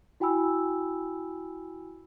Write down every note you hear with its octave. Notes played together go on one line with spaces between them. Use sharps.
E4 F#4 G5 G#5 B5 E6